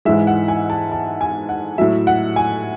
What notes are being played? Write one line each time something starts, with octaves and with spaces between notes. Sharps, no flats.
G#2 E3 G#3 E5
F#5
G#5
A5
A5
G#5
F#5
A2 F#3 E5
F#5
G#5